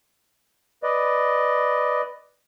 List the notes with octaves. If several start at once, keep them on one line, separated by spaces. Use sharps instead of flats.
B4 D5 D#5